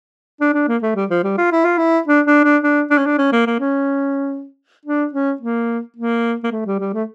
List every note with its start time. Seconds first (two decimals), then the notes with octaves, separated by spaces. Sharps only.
0.41 D4
0.54 D4
0.68 A#3
0.82 A3
0.95 G3
1.10 F3
1.24 G3
1.38 F4
1.52 E4
1.65 F4
1.78 E4
2.08 D4
2.26 D4
2.44 D4
2.63 D4
2.91 D4
2.98 C#4
3.06 D4
3.18 C#4
3.32 A#3
3.46 A#3
3.60 C#4
4.85 D4
5.13 C#4
5.41 A#3
5.96 A#3
6.44 A#3
6.52 A3
6.66 G3
6.80 G3
6.94 A3